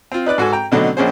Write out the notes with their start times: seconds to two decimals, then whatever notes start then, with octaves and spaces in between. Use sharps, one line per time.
0.12 C4 F4
0.26 D#4 B4 D5 F#6
0.38 G#2 F#4 A4 G#5
0.52 G5 A#5
0.72 B2 D3 F#3 A3 C4 D#4
0.97 A#1 A#2 C#4 G#4 C5